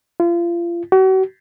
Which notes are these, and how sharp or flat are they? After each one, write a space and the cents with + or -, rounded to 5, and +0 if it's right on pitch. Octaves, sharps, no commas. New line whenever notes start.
F4 -30
F#4 +40